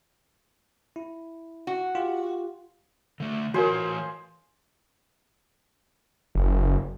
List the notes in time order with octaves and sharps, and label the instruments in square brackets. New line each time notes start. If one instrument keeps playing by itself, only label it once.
[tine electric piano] E4
[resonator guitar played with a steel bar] F#4
[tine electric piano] F4 G4
[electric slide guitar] D3 A3
[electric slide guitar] E3 C#5 [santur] F4 G#4 C5 [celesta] F#4 A#4
[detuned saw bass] F#1